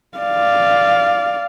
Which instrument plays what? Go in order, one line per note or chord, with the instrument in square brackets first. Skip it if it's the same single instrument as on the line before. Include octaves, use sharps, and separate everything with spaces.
[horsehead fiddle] D5 F5